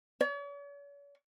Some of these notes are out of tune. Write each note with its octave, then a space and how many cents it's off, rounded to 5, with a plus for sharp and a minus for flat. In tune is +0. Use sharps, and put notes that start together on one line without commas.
C#5 +45